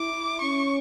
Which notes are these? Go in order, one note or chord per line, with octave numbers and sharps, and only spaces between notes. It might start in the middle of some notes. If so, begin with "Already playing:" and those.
Already playing: E4 D6
C#4 C#6